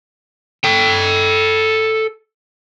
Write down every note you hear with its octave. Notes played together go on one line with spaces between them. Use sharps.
A4 G5